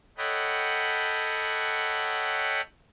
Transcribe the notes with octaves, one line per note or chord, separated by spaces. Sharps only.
A4 C#5 D#5 F#5 G5 B5